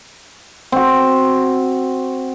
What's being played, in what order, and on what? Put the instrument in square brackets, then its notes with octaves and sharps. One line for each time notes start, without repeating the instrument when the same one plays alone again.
[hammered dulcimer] C4 F#4